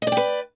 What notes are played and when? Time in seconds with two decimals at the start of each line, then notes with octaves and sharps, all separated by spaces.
0.02 D#5
0.07 D5
0.12 G5
0.17 B4